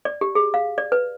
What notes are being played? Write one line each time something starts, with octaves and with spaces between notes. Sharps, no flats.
D5
G4
G#4
F5
D5
B4